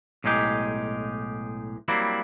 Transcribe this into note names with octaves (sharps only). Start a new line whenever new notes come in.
B1 A2 G#3 D#4 G4
F#3 G3 A#3 C4 E4